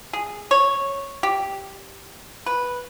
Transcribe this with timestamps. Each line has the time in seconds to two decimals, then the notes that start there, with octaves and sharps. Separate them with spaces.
0.13 G#4
0.51 C#5
1.23 G4
2.46 B4